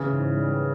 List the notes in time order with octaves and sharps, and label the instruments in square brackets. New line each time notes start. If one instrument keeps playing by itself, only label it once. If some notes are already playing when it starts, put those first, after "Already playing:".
Already playing: [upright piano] C#3 [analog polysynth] E3
[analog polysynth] G#2
G3